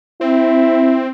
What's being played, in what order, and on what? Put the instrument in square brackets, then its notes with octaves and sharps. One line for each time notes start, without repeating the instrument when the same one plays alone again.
[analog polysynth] C4 [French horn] E4